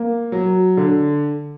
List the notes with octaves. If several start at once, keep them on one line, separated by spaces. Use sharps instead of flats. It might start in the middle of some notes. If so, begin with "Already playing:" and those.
Already playing: A#3
F#3
D3